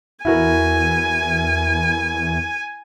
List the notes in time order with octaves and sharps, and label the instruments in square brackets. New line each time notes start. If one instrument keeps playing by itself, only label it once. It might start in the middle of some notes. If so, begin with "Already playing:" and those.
[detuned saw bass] E2 [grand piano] E4 F#4 A#4 [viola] G#5